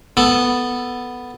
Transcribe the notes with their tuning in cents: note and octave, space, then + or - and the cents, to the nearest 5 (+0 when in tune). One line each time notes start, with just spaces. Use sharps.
B3 +0 A4 +0